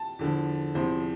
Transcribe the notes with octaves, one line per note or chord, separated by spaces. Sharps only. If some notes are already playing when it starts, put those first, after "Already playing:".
Already playing: A5
E2 D3 F3
E2 C3 F3 C5